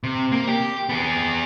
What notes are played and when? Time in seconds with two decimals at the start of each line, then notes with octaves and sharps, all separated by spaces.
0.03 C3
0.32 A#3
0.48 G4
0.89 B3 G#4